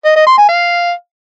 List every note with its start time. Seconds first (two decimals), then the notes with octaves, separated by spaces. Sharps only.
0.05 D#5
0.16 D#5
0.27 C6
0.38 G#5
0.49 F5